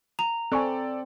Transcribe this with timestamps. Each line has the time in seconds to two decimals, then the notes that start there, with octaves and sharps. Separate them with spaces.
0.19 A#5 F7
0.52 C4 A4 D5 G#5 C#6 F#6